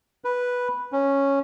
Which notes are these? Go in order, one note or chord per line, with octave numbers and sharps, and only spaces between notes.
B4
C#4